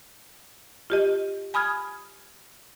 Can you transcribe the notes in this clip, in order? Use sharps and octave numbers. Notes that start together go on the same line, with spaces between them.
F4 G4 D#5
G#5 B5 D#6 F6 G#6